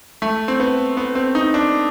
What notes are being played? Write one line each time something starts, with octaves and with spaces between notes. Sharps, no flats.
A3
C4
B3
B3
C4
D#4
D4